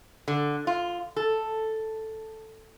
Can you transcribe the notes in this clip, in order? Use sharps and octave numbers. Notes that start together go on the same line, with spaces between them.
D3
F4
A4